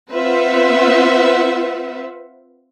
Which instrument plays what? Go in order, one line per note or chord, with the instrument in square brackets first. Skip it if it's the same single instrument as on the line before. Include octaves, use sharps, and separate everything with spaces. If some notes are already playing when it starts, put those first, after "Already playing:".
[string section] C4 F4 B4 C5 E5 F#5